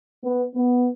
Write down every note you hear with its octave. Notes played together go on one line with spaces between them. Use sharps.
B3
B3